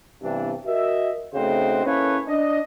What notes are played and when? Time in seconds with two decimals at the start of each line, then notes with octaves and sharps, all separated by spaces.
0.22 G2 C3 E3 B3 D4 E4
0.66 F#4 A#4 D#5 E5
1.34 C#3 A3 C4 D#4 F#4 C5
1.85 A#3 C#4 E4 A4 B4 C#5
2.28 D4 D#5